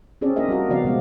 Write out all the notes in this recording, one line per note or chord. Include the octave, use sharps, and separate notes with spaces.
C4 C#4 G#4 A4 D5
A#3 D4 F4 A#4 D#5 E5
G3 F#4 A#4
C#3 F3 B3 F#4 D5 F5
B2 F3 G3 G#3 B3